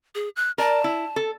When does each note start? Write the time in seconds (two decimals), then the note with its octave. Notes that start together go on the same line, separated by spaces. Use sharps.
0.15 G#4
0.36 F#6
0.58 A#4 D5 A5
0.84 E4
1.16 A4